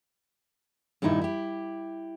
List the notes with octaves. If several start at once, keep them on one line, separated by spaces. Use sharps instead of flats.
G2 A#2 D#3 D#4 E4
E4 G4